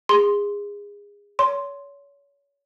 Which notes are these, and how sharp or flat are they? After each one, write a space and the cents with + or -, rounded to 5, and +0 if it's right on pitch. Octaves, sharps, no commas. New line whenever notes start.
G#4 -25 C6 +0
C#5 +30 C6 +0